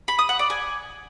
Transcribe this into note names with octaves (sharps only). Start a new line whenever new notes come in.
B5
D#6
F#5
D5
G#5